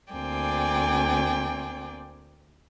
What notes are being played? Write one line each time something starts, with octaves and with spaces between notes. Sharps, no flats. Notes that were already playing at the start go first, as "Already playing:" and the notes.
D2 A#3 C4 D5 G5 G#5